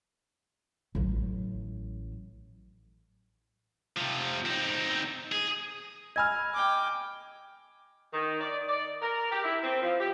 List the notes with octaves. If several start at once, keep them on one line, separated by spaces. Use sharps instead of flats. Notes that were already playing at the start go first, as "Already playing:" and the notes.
A1 F#3
C3 F3
C4 D#4
G#4
D#5 G#5 B5 E6 F6 G#6
G5 D6
D#3
D5
D5
A#4
G4
E4
C4
F3
G4